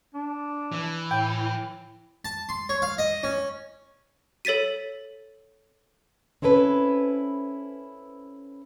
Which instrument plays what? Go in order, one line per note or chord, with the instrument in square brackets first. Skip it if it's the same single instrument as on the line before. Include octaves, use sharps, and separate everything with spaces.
[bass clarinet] D4
[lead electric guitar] E3
[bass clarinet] A2 [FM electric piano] G5
[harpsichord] A5
C6
C#5
F5
D#5
C#4
[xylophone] A4 C#5 A6 B6 D#7
[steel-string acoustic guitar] C4 C#4 E4 A4 B4